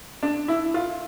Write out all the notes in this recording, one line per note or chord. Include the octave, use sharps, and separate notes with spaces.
D4
E4
F4